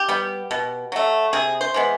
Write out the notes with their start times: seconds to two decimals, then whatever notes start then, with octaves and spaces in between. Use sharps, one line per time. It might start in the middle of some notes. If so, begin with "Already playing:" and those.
Already playing: G4
0.09 G3 B3
0.51 B2
0.92 F#3 A3
1.33 C3 G#4
1.61 C5
1.74 E3 G#3 B3